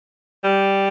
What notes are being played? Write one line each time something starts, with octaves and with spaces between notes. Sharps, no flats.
G3